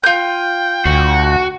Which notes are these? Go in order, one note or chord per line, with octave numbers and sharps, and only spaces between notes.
F4 G5 G6
D2 F#4